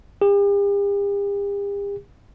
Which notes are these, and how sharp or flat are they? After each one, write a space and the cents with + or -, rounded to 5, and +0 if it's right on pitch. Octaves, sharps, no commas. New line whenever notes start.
G4 +45